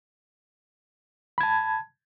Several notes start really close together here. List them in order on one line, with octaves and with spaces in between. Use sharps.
B5 G#6 A5